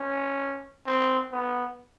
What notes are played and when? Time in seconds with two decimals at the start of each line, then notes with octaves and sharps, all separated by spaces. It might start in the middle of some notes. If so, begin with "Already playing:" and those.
Already playing: C#4
0.86 C4
1.32 B3